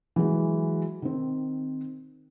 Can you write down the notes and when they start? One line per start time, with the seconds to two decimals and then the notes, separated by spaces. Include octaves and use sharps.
0.16 E3 F#3 G#3 F#4
1.02 D#3 C4